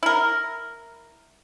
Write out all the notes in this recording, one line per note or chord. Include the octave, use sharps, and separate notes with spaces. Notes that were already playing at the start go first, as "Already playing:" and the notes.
E4 A#4